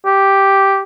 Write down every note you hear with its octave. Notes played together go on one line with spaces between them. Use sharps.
G4